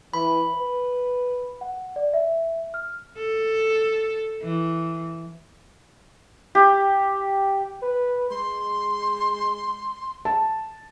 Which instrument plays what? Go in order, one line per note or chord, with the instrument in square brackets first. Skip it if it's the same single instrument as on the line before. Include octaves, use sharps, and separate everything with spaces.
[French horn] E3 [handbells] B5
[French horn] B4
[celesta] F#5
D5
E5
F6
[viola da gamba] A4
E3
[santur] G4
[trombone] B4
[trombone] G#3 [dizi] C6
[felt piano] A5